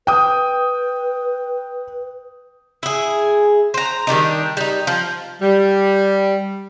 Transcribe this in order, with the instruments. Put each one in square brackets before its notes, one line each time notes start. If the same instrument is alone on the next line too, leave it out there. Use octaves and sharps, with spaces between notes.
[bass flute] B4 [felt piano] G5 D#6
[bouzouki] E4 G#4
C5 A#5
D#3 G3 D4 D#4
G3 D#4
F3
[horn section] G3